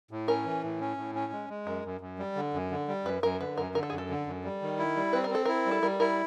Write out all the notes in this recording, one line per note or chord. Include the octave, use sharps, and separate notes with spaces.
A2
C#4 A#4
E3
A2
C#4
A2
C#4
G#3
G#3
F#2 A#4
F#2
F#2
G3
D3
F#2
D3
G3
F#2 B4
F#2 A#4
D3 B4
F#2 A#4
D3 A#4
A4
F#2 G#4
A4
D3
F#2
G3
D#3
E4
G3
C4 B4
A#4
C4 A4
E4 A#4
G3
A4
G3 A#4
E4 A#4